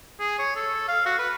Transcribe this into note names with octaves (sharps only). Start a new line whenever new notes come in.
G#4
C#5
A4
F5
F#4
B4